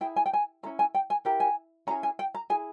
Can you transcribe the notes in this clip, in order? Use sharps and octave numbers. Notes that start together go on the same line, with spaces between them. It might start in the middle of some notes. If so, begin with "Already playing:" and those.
E4 G#4 G5
G#5
G5
G#5
C#4 E4 G#4 A#5
G#5
G5
G#5
E4 G4 A#4 A#5
G#5
C#4 E4 G#4 A#5
G#5
G5
A#5
E4 G#4 G#5